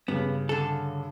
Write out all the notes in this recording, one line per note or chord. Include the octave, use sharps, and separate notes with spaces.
G2 C#3 B3
D3 A4